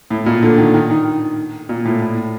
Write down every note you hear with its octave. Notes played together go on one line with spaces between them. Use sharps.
A2
A#2
D3
D#3
D#3
D#3
A#2
A2
A2